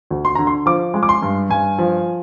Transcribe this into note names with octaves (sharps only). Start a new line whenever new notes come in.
D2
C6
D3 A#5
C6
F3 D6
G#3
D6
C6
G2
G2 G#5
F3